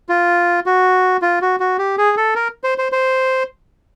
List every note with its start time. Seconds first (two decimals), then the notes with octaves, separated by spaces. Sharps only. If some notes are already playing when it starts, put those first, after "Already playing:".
0.09 F4
0.66 F#4
1.22 F4
1.42 F#4
1.60 F#4
1.79 G4
1.98 G#4
2.17 A4
2.35 A#4
2.64 C5
2.78 C5
2.92 C5